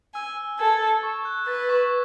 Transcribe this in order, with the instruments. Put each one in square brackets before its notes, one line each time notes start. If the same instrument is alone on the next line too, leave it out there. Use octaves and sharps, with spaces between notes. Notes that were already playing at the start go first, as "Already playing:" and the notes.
[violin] G#5 [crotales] E6
[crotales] E6
[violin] A4 [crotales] G#6
[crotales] E6
C#6
F#6
[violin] B4 [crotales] A6
[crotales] C#6